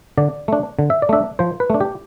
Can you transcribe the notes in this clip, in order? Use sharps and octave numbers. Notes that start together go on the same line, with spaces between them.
D3 D5
A3 D4
D3
E5
D5
A3 D4 E5
F3 C5
B4
A3 D4
G4